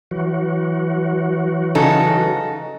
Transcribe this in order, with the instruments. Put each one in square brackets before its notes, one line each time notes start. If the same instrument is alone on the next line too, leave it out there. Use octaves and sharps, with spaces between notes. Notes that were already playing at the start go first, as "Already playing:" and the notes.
[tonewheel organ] E3 F#3 F#4
[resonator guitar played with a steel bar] C#3 D#4 A4